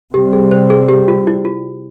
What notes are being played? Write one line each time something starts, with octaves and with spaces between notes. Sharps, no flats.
C3 G3 C4 G4
G#4
C5
G#4
G4
F4
E4
F4